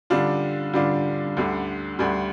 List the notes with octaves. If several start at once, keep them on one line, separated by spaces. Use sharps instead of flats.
D3 G3 D4 F4
D3 G3 D4 F4
D2 D3 G3
D2 D3 G3